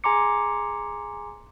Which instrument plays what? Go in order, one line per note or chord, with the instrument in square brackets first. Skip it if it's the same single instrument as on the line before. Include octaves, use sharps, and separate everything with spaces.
[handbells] G#4 G#5 A#5 C6 D6 C#7